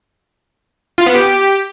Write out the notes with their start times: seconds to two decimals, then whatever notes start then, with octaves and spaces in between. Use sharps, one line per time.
0.98 F4
1.06 B3
1.15 G4